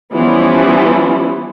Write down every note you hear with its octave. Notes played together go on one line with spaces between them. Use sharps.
E3 F3 G3 B3 C#4 E4